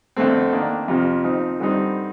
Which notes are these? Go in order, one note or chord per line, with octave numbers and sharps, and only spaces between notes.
F2 D3 A3 C4
D#3 A#3 D4
F2 C3 F3
F3 C4 D#4
G2 D3 G3 C4 D#4